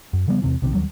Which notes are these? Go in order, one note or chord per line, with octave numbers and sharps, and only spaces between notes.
F#2
C#3 F3 G3 B3
E2 C3 E3
B1 C3 D#3
D#2 F#3 G3